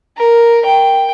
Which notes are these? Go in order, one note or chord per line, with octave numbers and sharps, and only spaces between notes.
A#4
G5